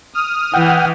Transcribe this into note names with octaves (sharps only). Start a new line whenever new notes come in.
D#6 F6
E3 F#5 G5